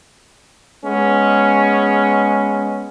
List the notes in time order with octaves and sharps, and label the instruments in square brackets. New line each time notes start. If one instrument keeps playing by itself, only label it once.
[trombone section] G#3 B3 C#4